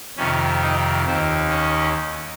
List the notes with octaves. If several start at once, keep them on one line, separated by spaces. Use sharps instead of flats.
F2 C3 D#3 C#4
D#4
D#2 D#3 C4
C#4